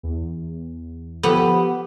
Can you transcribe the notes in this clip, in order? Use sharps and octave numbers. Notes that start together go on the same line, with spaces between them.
E2
F3 B3 G4 A4